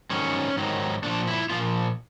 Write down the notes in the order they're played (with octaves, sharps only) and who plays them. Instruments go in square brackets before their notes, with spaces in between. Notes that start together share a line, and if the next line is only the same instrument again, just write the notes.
[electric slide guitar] G#2 D#3 F#3 C#4
G#2 D#3 F#3
A#2 F3 D4
E4
A#2 F3 F4